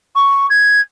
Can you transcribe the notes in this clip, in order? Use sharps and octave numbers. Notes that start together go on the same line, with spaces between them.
C#6
G#6